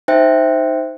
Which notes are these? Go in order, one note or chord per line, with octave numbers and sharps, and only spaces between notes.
D#4 C5 E5 G5